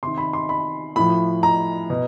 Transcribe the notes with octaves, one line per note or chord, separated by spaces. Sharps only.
C3 D#3 C6
B5
C6
B5
A2 F3 B5
A#5
B2